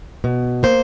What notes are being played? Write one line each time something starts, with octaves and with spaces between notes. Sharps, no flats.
B2
A#3 C5